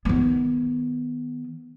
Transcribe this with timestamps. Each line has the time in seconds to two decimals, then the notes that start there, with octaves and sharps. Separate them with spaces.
0.05 D#3 B3